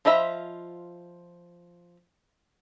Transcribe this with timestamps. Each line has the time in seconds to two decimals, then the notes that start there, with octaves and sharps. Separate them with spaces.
0.05 F3 F4 D#5 E5 B5